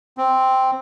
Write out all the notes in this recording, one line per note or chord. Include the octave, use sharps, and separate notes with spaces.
C4